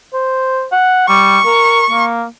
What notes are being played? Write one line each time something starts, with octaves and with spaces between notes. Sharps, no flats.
C5
F#5
G3 C#6
A#4
A#3